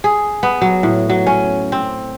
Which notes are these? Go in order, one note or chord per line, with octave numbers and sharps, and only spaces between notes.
G#4
B3
F#3
A2
F#3
C#4
C4